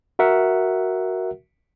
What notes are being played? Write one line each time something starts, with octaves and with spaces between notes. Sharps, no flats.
F#4 A#4 E5 F#5